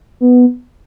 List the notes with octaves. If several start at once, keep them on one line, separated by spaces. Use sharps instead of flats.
B3